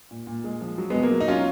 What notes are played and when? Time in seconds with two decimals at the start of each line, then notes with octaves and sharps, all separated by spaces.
0.11 A#2
0.27 A#2
0.44 G#3
0.61 F3
0.78 F#3
0.90 B2 G#3 B3
1.03 A#3
1.11 F#3
1.20 D#4
1.28 F#3 C#4 F4